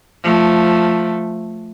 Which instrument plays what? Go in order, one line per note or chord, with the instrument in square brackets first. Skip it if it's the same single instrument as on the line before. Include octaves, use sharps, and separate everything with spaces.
[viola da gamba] F3 A3